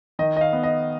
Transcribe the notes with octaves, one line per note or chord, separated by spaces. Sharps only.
D#3 D#5
D#5
F5
B3
D#5